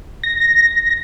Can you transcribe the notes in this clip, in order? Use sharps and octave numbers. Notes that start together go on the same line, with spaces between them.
A#6